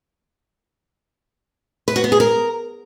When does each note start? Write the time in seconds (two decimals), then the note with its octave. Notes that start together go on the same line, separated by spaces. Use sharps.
1.88 B4
1.96 F#4
2.04 B3
2.12 G#4
2.20 A#4